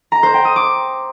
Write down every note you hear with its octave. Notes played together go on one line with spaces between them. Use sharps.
A#5
C5
G5
D#6
D6